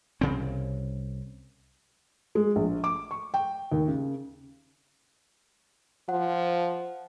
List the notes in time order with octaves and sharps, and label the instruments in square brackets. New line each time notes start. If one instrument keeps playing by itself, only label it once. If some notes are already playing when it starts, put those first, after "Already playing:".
[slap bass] C2 C#3 C4
[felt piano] G#3
A#1
D6
C#6
G5
D#2
C#3
[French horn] F3 [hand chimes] F#5